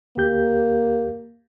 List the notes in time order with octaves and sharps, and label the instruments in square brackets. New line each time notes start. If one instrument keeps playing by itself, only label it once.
[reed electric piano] D2 G4 G6 [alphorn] A#3